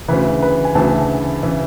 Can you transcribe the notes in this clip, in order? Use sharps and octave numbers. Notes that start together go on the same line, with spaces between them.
D2 C#3 E3 B4
B4
G#5
D2 C#3 E3 A5
C#3 E3